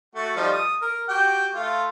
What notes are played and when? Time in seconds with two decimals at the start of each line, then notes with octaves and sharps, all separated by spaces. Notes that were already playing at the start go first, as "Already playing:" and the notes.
0.15 A3 F#4
0.36 F3 G3 D#4
0.52 D#6
0.81 A#4
1.09 F#4 G4 G5
1.55 A3 F4